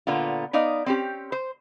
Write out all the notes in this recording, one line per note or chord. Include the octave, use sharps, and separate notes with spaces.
A#2 D3 B3 F4
B3 D#4 D5 F5
C4 C#4 G4
C5